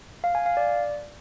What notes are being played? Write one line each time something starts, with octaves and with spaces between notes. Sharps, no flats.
F5
G#5
F5
D5